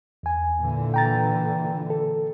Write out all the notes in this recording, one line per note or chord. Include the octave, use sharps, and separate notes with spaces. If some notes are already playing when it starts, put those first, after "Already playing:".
E2 G#5
A#2 D3 E3
G5 A#5 A6
A4